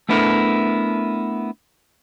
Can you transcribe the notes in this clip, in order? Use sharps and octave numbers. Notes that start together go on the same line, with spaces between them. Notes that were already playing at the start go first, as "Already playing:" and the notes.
A3 B3 D4 E4 A4 A#4